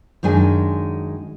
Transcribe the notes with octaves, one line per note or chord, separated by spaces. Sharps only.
F#2 D#3 G#3 D4 G#5